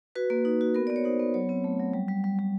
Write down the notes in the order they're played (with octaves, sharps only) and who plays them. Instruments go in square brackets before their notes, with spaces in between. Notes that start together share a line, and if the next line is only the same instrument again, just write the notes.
[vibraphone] F#4 B4
A#3
D#4
F#4
B3 A#4
B3 D5
C#5
D#4 C5
B3
F#3 C#5
C4
A3
F#3
G3
G3
G3
G3